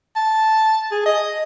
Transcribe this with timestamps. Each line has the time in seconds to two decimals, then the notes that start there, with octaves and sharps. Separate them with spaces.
0.16 A5
0.92 G#4
1.06 D#5